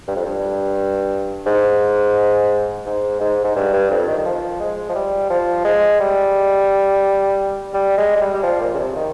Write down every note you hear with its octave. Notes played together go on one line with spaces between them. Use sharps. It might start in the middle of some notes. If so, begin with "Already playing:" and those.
G2
F2
G2
G#2
G#2
G#2
G#2
G2
G2
F2
D#3
D#3
F3
G#3
F3
G3
F3
G#3
G3
G3
G#3
G#3
G3
G3
F3
A#2
C#3
C3
D#3